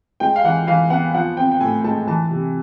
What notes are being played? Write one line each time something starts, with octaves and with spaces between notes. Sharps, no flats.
G#3 G5
F5
E3 F#5
E3 F5
B3 F#5
F3 F#5
C4 G5
G5
A2 G#5
G#3 A5
E3 A5
C3